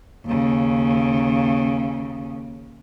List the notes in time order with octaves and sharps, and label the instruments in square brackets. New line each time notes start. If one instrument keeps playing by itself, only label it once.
[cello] D#2 C#3